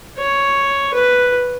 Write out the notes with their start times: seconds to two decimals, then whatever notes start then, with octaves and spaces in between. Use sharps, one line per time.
0.18 C#5
0.94 B4